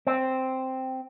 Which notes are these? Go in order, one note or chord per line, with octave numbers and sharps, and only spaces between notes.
C4